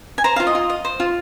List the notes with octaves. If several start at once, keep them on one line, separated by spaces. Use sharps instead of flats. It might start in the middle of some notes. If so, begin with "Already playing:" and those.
G#5
C5 A#5
F4 F5
D#5
F4
D#5
C5
F4